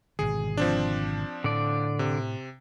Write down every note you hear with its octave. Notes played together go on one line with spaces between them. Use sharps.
G#1 B2 D3 G#4
F3 C4 D4
A2 D3 D5
C3